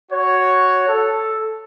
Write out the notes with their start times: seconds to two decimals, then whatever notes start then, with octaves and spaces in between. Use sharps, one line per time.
0.12 F#4 C#5
0.89 A4